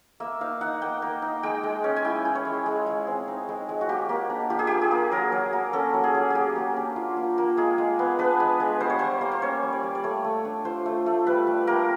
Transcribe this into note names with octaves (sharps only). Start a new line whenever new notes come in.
A#3 E5
D#4 F5
D#4 F#5
A#3 G5
A#3
D#4
G#3 G5
G#3
C#4
G#5
E4 G5
G#3
C#5
G#3
G#3
G#3
C4
D#4
G#3
G#3
F#4
A#3 G4
A#3
D4
F4 G4
G#4
A#3 G4
G#4
A#3
F#3 A#4
F#3
A#3
C#4 A4
F#3
G#4
F#3
A#3 G4 G#4
A#3
D4
F4
A#3
A#3
G#3 G#4
G#3
B3
D4 B4
G#3
G#3
G3 C5
C#5
G3 C5
A#3
C5
C#4 C#5
G3
D5
G3
D5
A3 C#5
A3
D4
F4 C5
A3
A3
G3 B4
G3
A#3 A#4